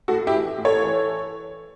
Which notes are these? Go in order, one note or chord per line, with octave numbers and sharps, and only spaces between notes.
A2 F#4 A4
E4 G4
E3
A2
A4 C#5
E3